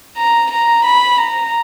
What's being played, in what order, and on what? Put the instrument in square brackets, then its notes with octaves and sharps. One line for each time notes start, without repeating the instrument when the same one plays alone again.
[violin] A#5
A#5
B5
A#5